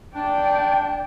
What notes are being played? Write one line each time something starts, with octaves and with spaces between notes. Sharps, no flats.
D4 D5 G5